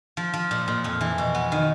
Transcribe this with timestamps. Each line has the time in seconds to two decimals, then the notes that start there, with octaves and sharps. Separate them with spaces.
0.17 F3
0.34 F3
0.51 A#2
0.68 A#2
0.84 F2
1.01 E3
1.18 B2
1.35 B3
1.52 D#3